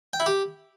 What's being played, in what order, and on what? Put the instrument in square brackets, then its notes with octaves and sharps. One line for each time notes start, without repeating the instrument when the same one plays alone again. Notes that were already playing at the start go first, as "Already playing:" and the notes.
[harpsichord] G5
E4
G4